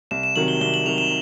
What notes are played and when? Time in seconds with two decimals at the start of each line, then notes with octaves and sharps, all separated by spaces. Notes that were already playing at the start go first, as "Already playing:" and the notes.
0.11 C2 E7
0.23 E7
0.36 C3 D#3 F#3 F#7
0.48 G7
0.61 C2 G7
0.74 F#7
0.86 C3 D#3 F#3 F7
0.98 E7